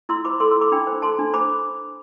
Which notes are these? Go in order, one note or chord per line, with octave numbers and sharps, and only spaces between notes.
E4 C6 E6
C5 B5 D6
A4 C6 E6
E4 C6 E6
B5 D6
D4 G5 B5
C5
A4 A5 C6
D4
C5 B5 D6